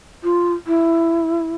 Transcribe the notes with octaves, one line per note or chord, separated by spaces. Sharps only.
F4
E4